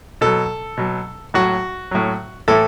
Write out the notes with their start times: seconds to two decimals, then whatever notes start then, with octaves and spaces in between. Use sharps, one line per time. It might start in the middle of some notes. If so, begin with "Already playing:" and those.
0.21 B2 F#3 A4
0.77 B2 F#3
1.34 A2 F#3 F#4
1.91 A2 F#3
2.48 A2 E3 A4